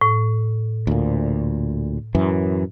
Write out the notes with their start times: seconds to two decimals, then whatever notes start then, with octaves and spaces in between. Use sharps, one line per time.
0.01 A2
0.87 D2 A#2
2.15 F#2 E3